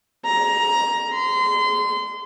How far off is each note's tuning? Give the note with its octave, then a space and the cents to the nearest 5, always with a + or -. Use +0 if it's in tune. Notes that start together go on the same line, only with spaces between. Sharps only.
A#5 +15
C6 -30